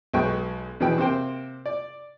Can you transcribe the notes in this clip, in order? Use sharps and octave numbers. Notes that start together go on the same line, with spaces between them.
B1 F#3 G#3 B4 G5 C#6
E2 B2 E3 B4 G5
C3 A#3 C5 G5
D5